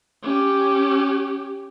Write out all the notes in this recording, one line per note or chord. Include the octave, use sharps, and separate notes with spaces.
C#4 G4